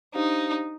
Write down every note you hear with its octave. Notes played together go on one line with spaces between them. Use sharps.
D4 D#4 G4 C5 F5